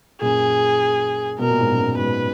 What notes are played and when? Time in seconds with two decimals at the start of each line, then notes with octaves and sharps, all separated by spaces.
0.21 F#2 A#2 G#4
1.38 B2 A#4
1.50 A#2
1.60 G#2
1.71 F#2 A#2
1.97 G#2 B2 B4